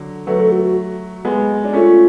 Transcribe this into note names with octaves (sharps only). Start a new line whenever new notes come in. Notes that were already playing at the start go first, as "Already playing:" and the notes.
Already playing: D3 F#3
F#3 A3 B4
A4
F#4
F#4
G#3 B3
D4
A3 C#4 F4